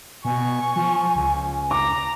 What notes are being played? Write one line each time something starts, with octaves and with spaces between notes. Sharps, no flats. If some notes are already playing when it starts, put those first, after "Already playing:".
B2 G#5 C#6
F3
C#2
A#5 D6